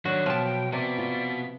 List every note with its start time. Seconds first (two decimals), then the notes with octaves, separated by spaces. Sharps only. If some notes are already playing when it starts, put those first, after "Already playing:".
0.05 D#3 F#3 D4 F#4
0.26 B2 F3 G5 A5
0.45 G5
0.73 C3 B3 F#4 D5
0.98 F4